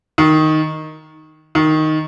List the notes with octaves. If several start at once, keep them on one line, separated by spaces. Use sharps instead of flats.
D#3
D#3